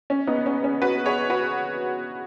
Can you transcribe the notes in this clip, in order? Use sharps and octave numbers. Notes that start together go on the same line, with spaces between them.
C#4
B3 D#4
C#4
C#4
F#4 B4
G#4 C#5
F#4 B4